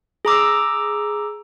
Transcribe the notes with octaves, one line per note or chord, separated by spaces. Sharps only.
G#4 A#5 D6 E6